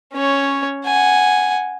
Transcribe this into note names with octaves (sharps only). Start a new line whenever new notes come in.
C#4 C#5
F#5 G#5